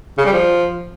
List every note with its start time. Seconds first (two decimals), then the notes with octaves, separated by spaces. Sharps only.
0.18 C#3
0.25 G3
0.33 F3